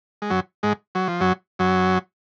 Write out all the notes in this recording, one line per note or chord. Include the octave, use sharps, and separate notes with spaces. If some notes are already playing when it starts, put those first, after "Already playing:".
G#3
F#2 F#3
G#2 G#3
F#3
F3
F#2 F#3
F#2 F#3